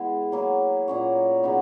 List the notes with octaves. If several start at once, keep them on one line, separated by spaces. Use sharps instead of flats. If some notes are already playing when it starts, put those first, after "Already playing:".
Already playing: E3 G#3 B3 E4
F#3 A#3 E4
A#2 A#3 C#4 F#4
C#3 F#3 B3 D#4